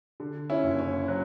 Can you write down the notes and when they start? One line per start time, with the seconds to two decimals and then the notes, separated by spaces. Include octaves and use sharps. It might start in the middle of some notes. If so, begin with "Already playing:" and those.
0.20 D3
0.50 C#4 E4
0.63 F#1
0.79 C#4
1.08 F#3